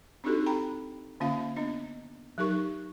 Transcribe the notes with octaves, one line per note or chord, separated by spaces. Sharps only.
C4 D4 D#4 F#4 G4 A4
G5 A#5 B5
D3 A#3 C#4 F4 E5 F5
B3 D4 D#5
F#3 D#4 G4 A#4 C#6